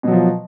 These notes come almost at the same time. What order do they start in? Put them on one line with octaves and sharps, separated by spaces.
B2 F#3 F3